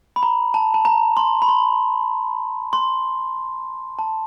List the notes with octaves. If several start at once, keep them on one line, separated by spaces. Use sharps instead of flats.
B5
A#5
A5
A5
A#5
C6
B5
C6
C6
A5